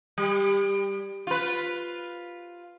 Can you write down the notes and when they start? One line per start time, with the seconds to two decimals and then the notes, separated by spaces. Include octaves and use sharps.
0.18 G3
1.27 F4 B4